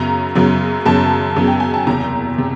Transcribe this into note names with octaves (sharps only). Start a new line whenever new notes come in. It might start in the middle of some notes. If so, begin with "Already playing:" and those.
Already playing: F#2 C#3 F#3 B3 A#5
F#2 C#3 F#3 B3
F#2 C#3 F#3 B3 A5
F#2 C#3 F#3 B3
G5
G#5
A5
F#1 E2 C3 A#5
C3